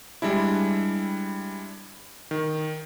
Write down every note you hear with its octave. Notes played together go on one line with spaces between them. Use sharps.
G3 G#3 D4 E4
D#3